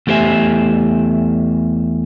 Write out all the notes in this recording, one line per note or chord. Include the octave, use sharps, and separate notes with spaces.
E2 A3 G4 C5 E5 G#5